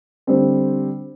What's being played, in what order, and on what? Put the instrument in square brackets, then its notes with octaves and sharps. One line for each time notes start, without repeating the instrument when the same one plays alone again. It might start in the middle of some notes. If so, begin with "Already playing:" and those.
[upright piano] D3 G3 C4